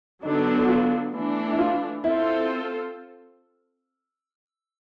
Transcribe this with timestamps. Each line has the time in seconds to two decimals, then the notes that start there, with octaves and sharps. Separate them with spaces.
0.23 D3 F#3 B3 D4 D#4
0.62 F#4
0.69 F4
1.14 E3 A3 D4
1.52 E4
1.59 F4
2.04 C4 E4 F4 A4 C5